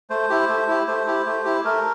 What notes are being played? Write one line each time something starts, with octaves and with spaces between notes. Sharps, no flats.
A3 C5
E4 G4
A3
E4 G4
A3 C5
E4 G4
A3
E4 G4
A3 A#4